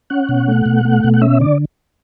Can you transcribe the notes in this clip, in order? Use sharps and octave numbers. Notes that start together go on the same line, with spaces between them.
C#4 F#5
B2
A3
B2
A3
B2
F#5
C#4 E5
D3 D5